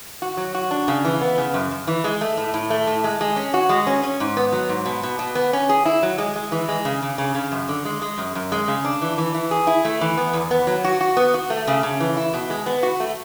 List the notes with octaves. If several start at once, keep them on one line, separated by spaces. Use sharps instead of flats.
F#4
F#3
F#4
D4
C#3
E3
B3
C#3
F#2
F#2
E3
G#3
A3
A2
A2
A3
A2
G#3
G#3
C#4
F#4
G#3
C#4
C#4
G#2
B3
F#3
G#2
B2
B2
B2
B3
C#4
G#4
E4
F#3
G#3
G#3
E3
G#3
C#3
C#3
C#3
C#3
F#2
D3
G#3
G#3
F#2
F#2
G#3
C#3
D4
E3
E3
E3
G#4
E4
A3
E3
B3
E2
B3
F#3
F#4
F#4
B3
F#4
A3
C#3
C#3
E3
E4
B2
G#3
B3
F#4
A3